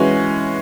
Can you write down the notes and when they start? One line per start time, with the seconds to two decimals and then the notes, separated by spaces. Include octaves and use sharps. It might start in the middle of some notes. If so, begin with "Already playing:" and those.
Already playing: E3 G#3 C#4 F#4